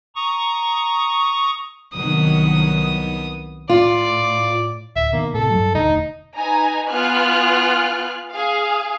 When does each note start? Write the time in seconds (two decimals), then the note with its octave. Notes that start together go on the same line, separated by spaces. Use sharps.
0.15 A#5 C#6 D#6
1.94 C2 D#3 F#3 B3 D#6
3.69 A2 F4 D5
4.96 D1 E5
5.13 B2 D#3 A#3
5.34 A2 C3 A4
5.51 G2 F#3
5.75 E1 D2 D#4
6.37 D#4 B4 G#5 A#5
6.90 B3 F4 G#5 F6 F#6
8.32 G#4 F5